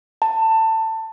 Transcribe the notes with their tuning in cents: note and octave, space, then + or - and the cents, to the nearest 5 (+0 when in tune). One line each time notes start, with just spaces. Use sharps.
A5 +20